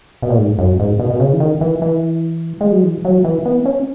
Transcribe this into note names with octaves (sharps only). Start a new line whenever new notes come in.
B2
A#2
G#2
F#2
G#2
B2
B2
C#3
E3
D#3
E3
E3
G#3
F#3
E3
F#3
E3
B3
C#4